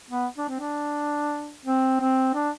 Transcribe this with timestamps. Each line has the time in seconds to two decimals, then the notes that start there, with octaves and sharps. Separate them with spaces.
0.11 B3
0.38 D4
0.49 C4
0.60 D4
1.66 C4
2.01 C4
2.35 D4